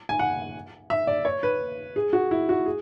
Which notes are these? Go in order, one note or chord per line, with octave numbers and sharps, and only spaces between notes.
G#5
F#5
E5
D5
C#5
B4
G#4
F#4
E4
F#4
G#4